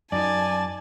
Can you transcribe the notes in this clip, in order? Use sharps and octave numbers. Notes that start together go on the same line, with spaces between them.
F#2 D#4 D5 G#5 A5